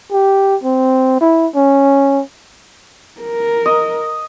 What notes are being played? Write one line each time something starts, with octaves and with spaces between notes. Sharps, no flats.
G4
C4
E4
C#4
A#4
D#5